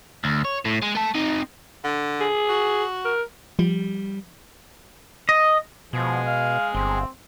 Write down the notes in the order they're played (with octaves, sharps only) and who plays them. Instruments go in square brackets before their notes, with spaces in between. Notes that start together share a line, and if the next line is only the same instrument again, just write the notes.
[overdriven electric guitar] D2
C#5
A2
G#3
A3 A5
C4 D#4
[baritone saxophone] D3
[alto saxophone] G#4
[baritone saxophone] F#4
[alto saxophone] A#4
[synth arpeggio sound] F3 [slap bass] G3
[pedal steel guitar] D#5
[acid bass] B2 [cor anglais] F3 [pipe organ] G#3 G#4
[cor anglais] F5
[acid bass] G1 [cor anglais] C4